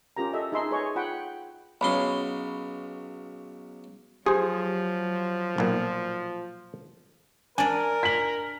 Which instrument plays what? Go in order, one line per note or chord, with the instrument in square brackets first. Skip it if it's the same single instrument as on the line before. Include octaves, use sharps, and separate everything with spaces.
[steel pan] C#4 F4 G4 A#4 A#5
A4 D#5 E5
D#4 G#4 E5 B5 C6
G#4 B4 C#5 D#5 C#6
F4 F#5 G5 B5
[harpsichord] B1 C#3 C6 [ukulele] C#4 B5
[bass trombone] F3 [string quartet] F#3 [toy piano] G4 [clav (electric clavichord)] G#4 C5
[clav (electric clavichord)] B1 A#2
[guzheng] D4 D5 [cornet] A#4 [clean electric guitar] G#5
[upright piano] B6 F#7